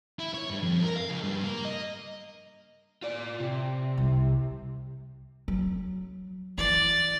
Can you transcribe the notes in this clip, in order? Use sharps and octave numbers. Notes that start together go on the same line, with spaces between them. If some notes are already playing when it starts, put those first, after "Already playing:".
E4
C#5
G2
F2
A#4
F5
C#2
G2
A#3
D#5
F4 D5
C3
C2
F#3
E3 D5